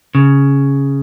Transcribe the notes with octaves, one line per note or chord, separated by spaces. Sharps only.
C#3